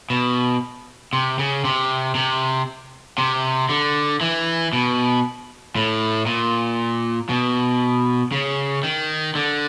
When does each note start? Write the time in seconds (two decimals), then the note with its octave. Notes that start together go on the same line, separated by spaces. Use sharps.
0.10 B2
1.13 C3
1.39 C#3
1.65 C3
2.15 C3
3.18 C3
3.69 D3
4.21 E3
4.73 B2
5.76 A2
6.26 A#2
7.29 B2
8.32 C#3
8.83 D#3
9.35 D3